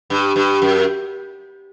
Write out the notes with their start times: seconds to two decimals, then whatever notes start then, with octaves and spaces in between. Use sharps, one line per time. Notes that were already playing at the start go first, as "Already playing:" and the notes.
0.10 G2
0.36 G2
0.62 F#2